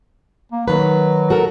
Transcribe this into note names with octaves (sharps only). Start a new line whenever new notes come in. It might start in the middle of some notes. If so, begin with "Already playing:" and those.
A#3
D#3 F#3 B4
F#4 A4 A#4